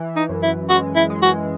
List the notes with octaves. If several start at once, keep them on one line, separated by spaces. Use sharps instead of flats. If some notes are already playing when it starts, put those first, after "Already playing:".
Already playing: E3
D#4
F#2
E4
G#3 F#4
E4
G#3
F#4